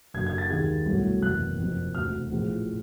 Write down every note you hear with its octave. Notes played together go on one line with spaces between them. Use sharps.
F#1 F#2 D3 G#6
G#6
A6
D#2 D#3 G#3 G#6
C2 B2 F#3 A3
F#1 E2 C3 E3 F#6
F#1 F2 C3
E1 D2 C3 F6
A#1 A2 F3 G#3